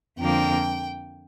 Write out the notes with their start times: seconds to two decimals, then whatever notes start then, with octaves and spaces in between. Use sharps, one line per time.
0.20 F2 D3 F3 A#3 G5